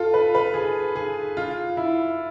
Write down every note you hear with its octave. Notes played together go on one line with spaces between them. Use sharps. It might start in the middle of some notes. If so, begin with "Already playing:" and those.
Already playing: F4 A4
B4
B4
G#4
G#4
F4
E4